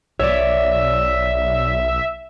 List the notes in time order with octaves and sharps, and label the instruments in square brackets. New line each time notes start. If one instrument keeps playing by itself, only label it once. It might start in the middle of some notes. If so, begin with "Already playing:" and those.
[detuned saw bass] B1 [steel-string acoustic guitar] C#5 D5 [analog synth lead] E5